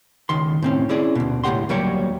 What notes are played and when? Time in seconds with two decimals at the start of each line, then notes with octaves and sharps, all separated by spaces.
0.29 C#2 D#3 C6
0.63 A2 C4 C#4
0.89 C#4 E4 G#4 D5
1.15 D2 B2
1.44 C#2 A2 C4 G4 F#5 C6
1.69 D2 F#3 G3 A#3 G4 C#5